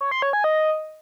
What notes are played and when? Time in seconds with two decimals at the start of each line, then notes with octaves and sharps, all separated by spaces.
0.01 C#5
0.11 C6
0.22 C#5
0.33 G#5
0.44 D#5